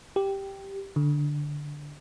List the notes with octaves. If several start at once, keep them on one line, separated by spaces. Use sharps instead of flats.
G4
D3